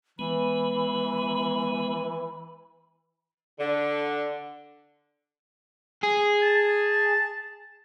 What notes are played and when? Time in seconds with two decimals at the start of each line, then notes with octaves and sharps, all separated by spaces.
0.19 E3 G#3 B3 B5
3.60 D3
6.03 G#4
6.42 A5